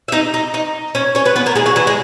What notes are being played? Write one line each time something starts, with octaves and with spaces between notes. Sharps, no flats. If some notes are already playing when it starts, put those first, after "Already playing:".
E5
D#4 D#5
D#4 D#5
D#4 D#5
C#4 C#5
C#4 C#5
B3 B4
B3 B4
A#3 A#4
G#3 G#4
F#3 F#4
E3 E4
G#3 G#4